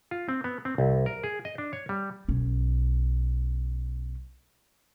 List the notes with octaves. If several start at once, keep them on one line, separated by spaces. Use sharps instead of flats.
F4
C4
B3
C4
C2
A#4
G#4
D#5
D4
C#5
G3
B1 C#4